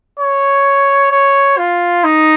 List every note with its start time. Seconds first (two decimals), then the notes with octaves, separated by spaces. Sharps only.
0.20 C#5
1.12 C#5
1.58 F4
2.04 D#4